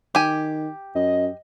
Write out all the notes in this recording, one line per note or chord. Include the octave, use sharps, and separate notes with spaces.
D#3 G4 G#5
F#2 D#5